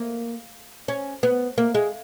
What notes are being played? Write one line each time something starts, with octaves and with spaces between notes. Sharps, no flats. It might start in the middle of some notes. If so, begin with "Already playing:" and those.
Already playing: A#3
C#4
B3
A#3
G#3